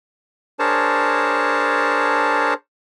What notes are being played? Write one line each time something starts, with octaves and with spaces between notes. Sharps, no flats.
D4 G#4 A#4 C5 C#5 A5